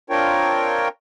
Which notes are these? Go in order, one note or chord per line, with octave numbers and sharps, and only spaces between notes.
C4 D4 F4 A#4 C#5 G5